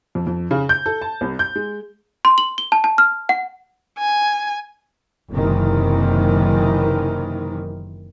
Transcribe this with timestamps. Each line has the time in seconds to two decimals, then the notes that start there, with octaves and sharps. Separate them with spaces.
0.15 F2
0.27 F2
0.51 C#3
0.69 G6
0.86 A4
1.01 A5
1.21 C2
1.39 G6
1.56 G#3
2.25 C6
2.38 F#7
2.58 G7
2.72 A5
2.84 A5
2.98 F6
3.29 F#5
3.98 G#5
5.31 F#1 C3 D#3 E3